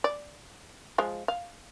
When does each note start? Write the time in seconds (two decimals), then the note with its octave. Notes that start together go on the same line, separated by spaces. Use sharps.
0.04 D5
0.98 F3 G#3
1.28 F5